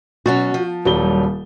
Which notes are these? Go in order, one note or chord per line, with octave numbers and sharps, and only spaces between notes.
B2 F#3 C#4 F#4 A6
F3
D#1 F#3 G3 G7